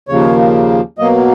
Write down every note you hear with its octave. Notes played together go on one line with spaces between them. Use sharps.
D#2 C#3 F3 A#3 C#5
B2 F#3 A#3 D#5